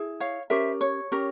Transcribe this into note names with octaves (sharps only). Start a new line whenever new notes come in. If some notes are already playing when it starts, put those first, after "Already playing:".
Already playing: E4 G#4
C#5 F5
C#4 G4 A#4 C5 E5
C#5
C#4 G4 A#4